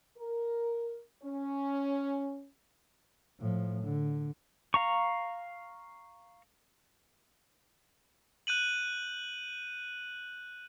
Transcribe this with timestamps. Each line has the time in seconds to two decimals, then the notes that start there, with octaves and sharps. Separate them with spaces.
0.18 A#4
1.23 C#4
3.40 A2 F3
3.84 D3
4.74 F5 A#5 C#6
8.47 F#6 G6 D#7 F#7